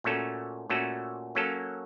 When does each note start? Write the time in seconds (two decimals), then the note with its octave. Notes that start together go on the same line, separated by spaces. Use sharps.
0.04 A#2 A3 C#4 F#4 A4
0.70 A#2 A3 C#4 F#4 A4
1.35 F#3 A#3 C#4 A4